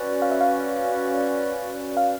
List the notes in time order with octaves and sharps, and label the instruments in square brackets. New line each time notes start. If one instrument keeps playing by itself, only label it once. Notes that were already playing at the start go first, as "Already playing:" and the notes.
Already playing: [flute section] C#4 F#4 B4 D5
[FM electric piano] F5
E5
F5
F5